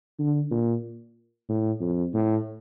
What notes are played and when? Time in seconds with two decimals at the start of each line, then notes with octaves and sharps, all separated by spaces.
0.19 D3
0.51 A#2
1.49 A2
1.81 F2
2.14 A2